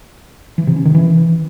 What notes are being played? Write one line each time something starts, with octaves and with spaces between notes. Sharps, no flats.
E3
C3
C#4
D#3
E3